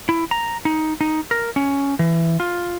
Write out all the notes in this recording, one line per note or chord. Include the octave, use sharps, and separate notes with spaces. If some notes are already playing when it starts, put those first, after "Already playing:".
E4
A#5
D#4
D#4
A#4
C#4
E3
F4